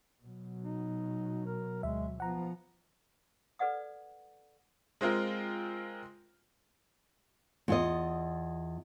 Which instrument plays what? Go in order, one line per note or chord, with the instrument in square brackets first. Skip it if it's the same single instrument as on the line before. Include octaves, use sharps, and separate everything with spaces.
[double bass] B2 F#3
[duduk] D#4
A#4
[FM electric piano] D2 E5 [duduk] G#3
[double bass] F3 [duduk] B3 [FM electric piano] F#5 A#5
[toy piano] A4 B4 D5 F#5 D#6
[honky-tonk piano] G#3 C4 F4 A#4
[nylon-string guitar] E2 F4 D#5